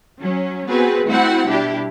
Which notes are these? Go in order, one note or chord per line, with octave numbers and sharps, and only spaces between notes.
F#3 C#4
B3 C4 F#4 G#4 B4
A3 C4 E4 F#4 F#5
B2 G3 D4 E4 G4